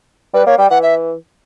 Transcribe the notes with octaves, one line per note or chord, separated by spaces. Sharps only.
G3 B4
A#3 C#5
G3 G5
E3 F#5
E5